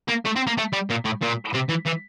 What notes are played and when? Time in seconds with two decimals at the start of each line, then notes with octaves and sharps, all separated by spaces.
0.09 A#3
0.25 A3
0.36 C4
0.47 A#3
0.58 A3
0.73 G3
0.90 A#2
1.05 A2
1.22 A#2
1.54 C3
1.69 E3
1.86 E3